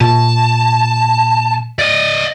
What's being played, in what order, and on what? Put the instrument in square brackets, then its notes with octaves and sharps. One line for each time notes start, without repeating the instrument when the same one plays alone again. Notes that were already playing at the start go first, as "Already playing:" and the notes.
[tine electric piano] A#2 [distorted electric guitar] A5
[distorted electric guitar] D5 D#5